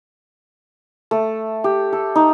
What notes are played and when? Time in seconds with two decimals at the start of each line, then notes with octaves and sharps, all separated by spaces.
1.11 A3
1.64 G4
1.93 A4
2.15 D#4